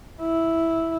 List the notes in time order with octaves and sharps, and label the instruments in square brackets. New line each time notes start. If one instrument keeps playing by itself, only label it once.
[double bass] E4